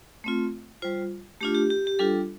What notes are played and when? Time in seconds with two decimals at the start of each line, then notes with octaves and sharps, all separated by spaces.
0.24 A3 C4 F4
0.82 G3 F4 C5
1.41 A3 D4 F4 G4
1.55 G4
1.70 G4
1.87 G4
1.99 G3 D4 F4 A4